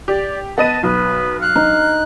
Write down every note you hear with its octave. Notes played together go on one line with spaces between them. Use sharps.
G4 D5
B3 B4 D#5 A5 D#7
B1 B3 B4
F5 F#6
D#4